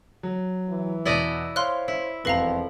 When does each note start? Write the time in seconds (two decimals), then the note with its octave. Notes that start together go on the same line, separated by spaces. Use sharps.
0.23 F#3
0.69 E3
1.05 E2 B2 E4 D5 D#5
1.56 C5 C#5 F5 C6 F6 F#6
1.88 E4
2.25 E1 F2 B4 F5 A#5 A#6 F#7